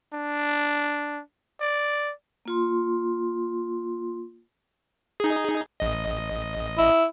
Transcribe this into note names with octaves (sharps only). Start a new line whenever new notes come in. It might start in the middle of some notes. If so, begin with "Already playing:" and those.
D4
D5
A#3 F4 C6
D#4 G#4
A1 D#5
E4